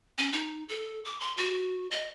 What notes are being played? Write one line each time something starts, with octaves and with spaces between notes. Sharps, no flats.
C#4
D#4
A4
D6
C6
F#4
D#5